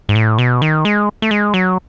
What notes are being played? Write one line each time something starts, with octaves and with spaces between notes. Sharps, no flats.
G#2
A2
B2
D#3
G#3
A3
G#3
F#3